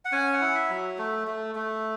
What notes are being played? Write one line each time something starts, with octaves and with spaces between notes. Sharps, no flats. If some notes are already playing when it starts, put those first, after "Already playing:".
F#5
C#4 G#5
F#5
E4
E5
F#3
A3
A3
A3